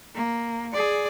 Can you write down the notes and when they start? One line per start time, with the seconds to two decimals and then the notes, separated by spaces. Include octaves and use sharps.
0.15 A#3
0.72 G#4 D5